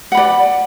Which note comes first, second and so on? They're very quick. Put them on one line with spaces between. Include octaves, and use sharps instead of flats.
F#5 B5 D5